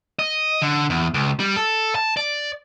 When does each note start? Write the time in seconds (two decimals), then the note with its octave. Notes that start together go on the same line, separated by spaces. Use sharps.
0.19 D#5
0.62 D3
0.90 E2
1.14 C#2
1.40 G3
1.56 A4
1.95 A5
2.17 D5